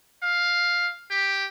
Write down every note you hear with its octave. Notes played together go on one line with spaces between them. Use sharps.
F5
G4